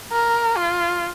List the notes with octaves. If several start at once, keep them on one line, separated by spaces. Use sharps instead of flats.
A#4
F4